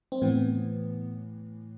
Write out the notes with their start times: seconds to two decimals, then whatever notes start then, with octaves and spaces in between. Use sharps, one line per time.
0.12 C4
0.22 A2 E3 B3